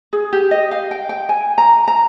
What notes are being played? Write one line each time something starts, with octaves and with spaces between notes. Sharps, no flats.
G#4
G4
D#5
F5
G5
G5
G#5
A#5
A#5